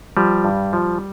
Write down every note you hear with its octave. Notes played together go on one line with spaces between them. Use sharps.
F3 G3
G2
F3